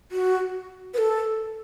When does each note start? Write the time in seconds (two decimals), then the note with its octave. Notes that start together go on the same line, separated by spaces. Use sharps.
0.12 F#4
0.94 B4
0.98 A4